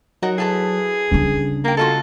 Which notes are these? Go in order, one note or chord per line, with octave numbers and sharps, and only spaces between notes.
F#3 D#4 F#4 A#4
E4 G#4 A4 B4
C#3 G3 D4
A#3 F5 G5
G#3 F4 F#4 A4